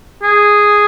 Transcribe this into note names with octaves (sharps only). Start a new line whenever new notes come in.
G#4